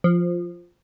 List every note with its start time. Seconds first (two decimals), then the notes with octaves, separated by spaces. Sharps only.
0.04 F3